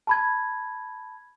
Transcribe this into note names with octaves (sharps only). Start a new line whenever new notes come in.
A5 B5 G#6